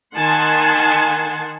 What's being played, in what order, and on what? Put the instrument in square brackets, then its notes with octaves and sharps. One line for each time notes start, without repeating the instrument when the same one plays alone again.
[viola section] D#3 F#5 G#5 A5 C6